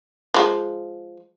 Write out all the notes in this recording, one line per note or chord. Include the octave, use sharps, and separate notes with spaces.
F3 G#3